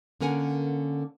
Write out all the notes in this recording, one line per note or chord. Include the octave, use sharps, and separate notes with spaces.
D3 A#3 C#4 A#4 F#5 G#5